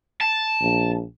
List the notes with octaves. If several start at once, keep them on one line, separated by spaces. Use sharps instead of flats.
A5
A#1